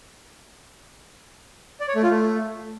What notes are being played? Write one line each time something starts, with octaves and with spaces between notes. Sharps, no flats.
D5
C#5
A3
F4
A3